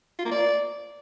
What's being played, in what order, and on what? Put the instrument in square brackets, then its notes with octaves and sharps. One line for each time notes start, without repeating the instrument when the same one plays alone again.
[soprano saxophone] F4
A#3
D5